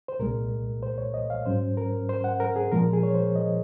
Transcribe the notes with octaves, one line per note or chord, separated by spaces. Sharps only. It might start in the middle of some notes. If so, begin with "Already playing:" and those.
C5
C2 A#2 G#3 A#4
C5
C#5
D#5
F5
G#2 F#3 C#4 C5
A#4
C5
F#5
A#4
G#4
A#2 F3 G#3 A#4
G#4
C#5
C5
D#5